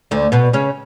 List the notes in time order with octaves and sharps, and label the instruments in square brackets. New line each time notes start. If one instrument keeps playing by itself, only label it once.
[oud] D2 D3
B2 B3
C#3 C#4